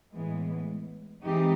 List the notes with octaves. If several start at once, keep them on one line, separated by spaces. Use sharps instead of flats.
A2 E3 G#3 B3
E3 G#3 C4 D#4 G4